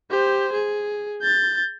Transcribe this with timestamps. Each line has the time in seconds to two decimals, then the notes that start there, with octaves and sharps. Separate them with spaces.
0.11 G4 C5
0.53 G#4
1.22 G6 A6